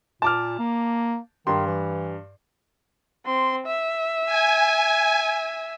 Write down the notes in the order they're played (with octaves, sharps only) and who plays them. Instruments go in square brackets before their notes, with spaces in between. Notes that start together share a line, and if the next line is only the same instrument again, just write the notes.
[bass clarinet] A#2 [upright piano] A5 D6 F6
[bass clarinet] A#3
[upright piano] G2 C6 [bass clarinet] D#3
[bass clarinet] E3
[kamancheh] C4 C6
E5
[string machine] G#5